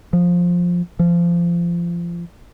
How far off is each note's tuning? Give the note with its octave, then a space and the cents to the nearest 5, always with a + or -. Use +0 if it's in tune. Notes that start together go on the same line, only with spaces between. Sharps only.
F3 +10
F3 -25